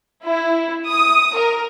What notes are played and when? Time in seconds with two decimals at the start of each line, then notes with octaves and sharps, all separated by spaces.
0.23 E4
0.88 D#6
1.35 A#4